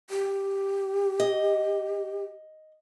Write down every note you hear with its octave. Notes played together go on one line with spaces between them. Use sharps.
G4
D#5